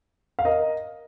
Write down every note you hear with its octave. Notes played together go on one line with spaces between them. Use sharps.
F5
A#4 D#5